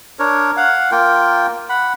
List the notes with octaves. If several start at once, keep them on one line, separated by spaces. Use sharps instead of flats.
D4 A#4 C#5
F5 F#5
A#3 F4 A#4 G5
F#5 B5